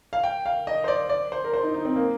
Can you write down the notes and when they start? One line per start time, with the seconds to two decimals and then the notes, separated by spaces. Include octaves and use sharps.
0.13 F5
0.24 G5
0.46 F5
0.67 D#5
0.84 C5
0.88 D5
1.10 D5
1.32 C5
1.44 A#4
1.54 C5
1.63 D#4
1.74 D#4
1.85 C4
1.96 A#3